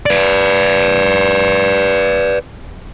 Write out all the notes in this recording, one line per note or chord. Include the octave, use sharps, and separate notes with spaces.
B4 D5